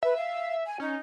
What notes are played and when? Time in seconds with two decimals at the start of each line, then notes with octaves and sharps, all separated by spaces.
0.03 B4 E5
0.16 F5
0.66 G#5
0.80 C#4 D#4